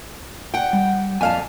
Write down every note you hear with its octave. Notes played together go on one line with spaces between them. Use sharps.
F#5 G5
G3
F2 A#2 F5 G#5 A5